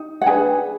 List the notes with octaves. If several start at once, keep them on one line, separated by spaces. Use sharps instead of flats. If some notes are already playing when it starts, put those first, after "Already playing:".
Already playing: D#4
F#5
D4 G#4 B4 G#5